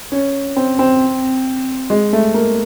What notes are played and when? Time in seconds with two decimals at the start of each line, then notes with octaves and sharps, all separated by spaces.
0.12 C#4
0.56 C4
0.79 C4
1.90 G#3
2.13 A3
2.34 A#3